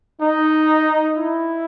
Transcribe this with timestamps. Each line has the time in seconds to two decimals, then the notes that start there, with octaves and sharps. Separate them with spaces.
0.22 D#4
1.17 E4